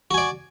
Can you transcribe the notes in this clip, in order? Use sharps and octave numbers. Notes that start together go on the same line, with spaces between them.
F#4 D5 G#5